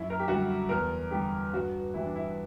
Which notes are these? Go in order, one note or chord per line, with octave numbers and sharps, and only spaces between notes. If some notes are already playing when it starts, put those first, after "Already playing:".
Already playing: F#2 E4
A#4
G4
D3 G3 F#4
E2 A#4
D3 G3 G4
G2 F#4
E3 G3 E4
D4
E4